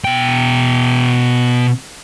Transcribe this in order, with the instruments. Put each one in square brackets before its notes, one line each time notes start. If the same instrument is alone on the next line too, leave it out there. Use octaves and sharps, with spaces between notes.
[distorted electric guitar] B2 G5